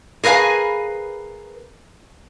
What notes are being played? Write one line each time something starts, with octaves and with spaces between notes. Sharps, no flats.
G#4 A#4 B4 F5 G#5